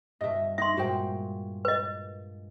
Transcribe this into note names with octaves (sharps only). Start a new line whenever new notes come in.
G2 B2 D#5 E5
D#4 E5 C6
G2 A#2 G#3 F#4 C5 G5
B4 D#5